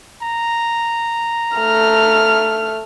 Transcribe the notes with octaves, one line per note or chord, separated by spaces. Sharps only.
A#5
A3 F6